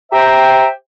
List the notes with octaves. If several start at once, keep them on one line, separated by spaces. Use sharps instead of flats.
G4 C5 E5 G5 A#5